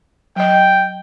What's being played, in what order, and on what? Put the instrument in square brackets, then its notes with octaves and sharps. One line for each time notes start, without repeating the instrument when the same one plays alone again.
[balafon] F#3 D#5 [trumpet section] G5